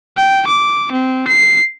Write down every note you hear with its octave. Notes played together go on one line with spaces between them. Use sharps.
G5
D6
C4
C7